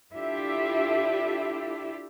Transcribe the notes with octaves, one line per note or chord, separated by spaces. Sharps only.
D4 E4 F4 G4 A4 E5